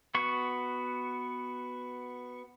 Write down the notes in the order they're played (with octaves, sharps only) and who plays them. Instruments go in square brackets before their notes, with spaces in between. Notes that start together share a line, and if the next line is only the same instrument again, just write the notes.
[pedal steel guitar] B3 F#4 C#6